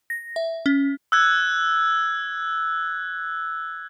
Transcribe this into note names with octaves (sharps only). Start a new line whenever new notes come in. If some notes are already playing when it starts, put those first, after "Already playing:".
A#6
E5
C#4
E6 F#6 G#6